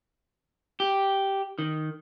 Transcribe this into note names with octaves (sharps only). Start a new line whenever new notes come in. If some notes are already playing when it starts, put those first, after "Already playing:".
G4
D#3